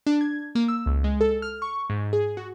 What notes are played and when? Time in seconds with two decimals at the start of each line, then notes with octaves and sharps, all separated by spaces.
0.07 D4
0.21 G#6
0.55 A#3
0.68 E6
0.86 C#2
1.04 G#3
1.21 A4
1.42 F6
1.62 C#6
1.90 G#2
2.13 G#4
2.37 F#4